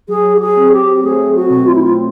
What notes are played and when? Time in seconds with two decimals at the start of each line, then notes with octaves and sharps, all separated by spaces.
0.08 F#3 G#4
0.36 G4
0.40 G#4
0.56 C4
0.72 G4
1.03 A3 G#4
1.35 F#4
1.50 B2
1.67 F4
1.75 E4
1.84 F4